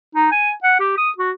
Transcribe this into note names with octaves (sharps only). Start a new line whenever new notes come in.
D#4
G#5
F#5
G4
D#6
F#4